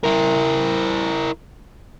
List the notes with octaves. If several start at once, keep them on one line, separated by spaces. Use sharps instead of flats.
E4 A#4